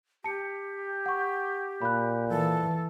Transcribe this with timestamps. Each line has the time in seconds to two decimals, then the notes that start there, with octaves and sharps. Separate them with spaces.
0.24 G4 A5 C#7
1.06 F#5 C#6
1.82 A#2 B5 F#6
2.29 E3 A4